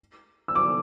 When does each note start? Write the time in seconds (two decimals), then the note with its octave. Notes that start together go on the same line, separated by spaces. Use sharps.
0.48 E6
0.55 D6